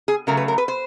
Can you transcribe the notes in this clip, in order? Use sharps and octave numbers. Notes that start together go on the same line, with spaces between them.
G#4
C#3 F#3 A3 A#4
B4
A#4
B4
C5